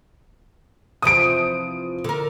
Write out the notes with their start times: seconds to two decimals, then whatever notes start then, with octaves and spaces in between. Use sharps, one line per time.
1.02 C3 E3 F3 D#6 D7
2.04 D3 A#4